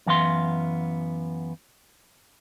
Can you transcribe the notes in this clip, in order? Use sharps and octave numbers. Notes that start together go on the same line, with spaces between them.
F#2 E3 B3 F5 C6